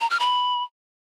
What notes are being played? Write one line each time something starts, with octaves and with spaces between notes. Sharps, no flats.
A#5
F6
B5